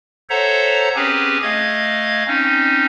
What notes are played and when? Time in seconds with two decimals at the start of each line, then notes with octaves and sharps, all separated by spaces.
0.30 A4 C5 C#5 E5 F#5 A#5
0.96 C4 C#4 G4 G#4 B4
1.43 A3 D#5 F5 G#6
2.27 C4 C#4 D#4